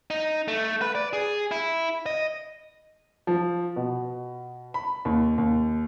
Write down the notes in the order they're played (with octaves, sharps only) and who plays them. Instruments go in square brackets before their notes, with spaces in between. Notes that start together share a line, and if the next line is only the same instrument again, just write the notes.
[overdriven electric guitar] D#4
A3
B4
D5
G#4
E4
D#5
[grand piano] F3
B2
B5
D#2
D#2